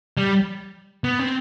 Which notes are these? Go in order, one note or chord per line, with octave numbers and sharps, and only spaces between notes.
G3
B3
C4